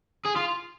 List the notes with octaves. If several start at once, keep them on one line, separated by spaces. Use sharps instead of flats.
G#4
F4